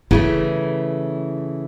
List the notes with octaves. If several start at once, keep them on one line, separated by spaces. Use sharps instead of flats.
C#3 E3 A3 E4